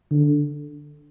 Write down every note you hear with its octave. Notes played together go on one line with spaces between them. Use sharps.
D3